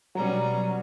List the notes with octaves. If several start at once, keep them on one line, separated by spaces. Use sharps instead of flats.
B2 F#3 G3 C#4 A#5